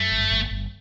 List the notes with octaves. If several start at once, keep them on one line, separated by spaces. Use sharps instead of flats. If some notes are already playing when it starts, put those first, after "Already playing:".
Already playing: F#2 A3
G1
G1
G1